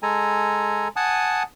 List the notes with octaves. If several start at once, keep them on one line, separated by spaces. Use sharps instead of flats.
G#3 A4 G#5 A#5
F#5 G#5 A5 D#6